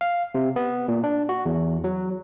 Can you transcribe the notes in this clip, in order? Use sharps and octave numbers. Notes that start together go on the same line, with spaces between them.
F5
C3
B3
A#2
D4
F#4
E2
F#3